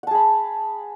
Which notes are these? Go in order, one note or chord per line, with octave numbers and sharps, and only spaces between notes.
G#4 F#5 A5 B5